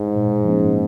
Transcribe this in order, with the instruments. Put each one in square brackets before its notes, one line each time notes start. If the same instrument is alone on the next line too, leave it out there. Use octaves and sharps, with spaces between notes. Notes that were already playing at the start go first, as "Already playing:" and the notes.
Already playing: [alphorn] G#2
[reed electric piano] A#2
F3 A#3 C#4